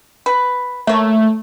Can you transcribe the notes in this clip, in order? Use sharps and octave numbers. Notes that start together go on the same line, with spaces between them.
B4
A3 A#3 C#5